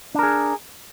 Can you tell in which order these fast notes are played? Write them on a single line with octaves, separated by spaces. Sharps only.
D4 A#4 G#4